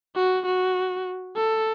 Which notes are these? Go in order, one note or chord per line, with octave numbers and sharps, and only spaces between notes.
F#4
F#4
A4